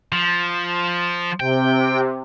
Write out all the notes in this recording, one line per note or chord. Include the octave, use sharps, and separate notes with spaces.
F3
C3 G5